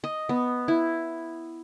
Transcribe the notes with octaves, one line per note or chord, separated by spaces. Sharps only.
D#5
B3
E4